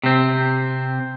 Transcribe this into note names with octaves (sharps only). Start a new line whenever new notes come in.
C3 C4